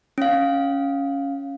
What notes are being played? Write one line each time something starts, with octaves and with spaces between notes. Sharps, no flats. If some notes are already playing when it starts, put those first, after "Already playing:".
C#4 F5